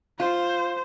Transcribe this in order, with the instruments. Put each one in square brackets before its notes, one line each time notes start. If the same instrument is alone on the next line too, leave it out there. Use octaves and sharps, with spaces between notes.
[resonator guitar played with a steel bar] F4 [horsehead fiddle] C5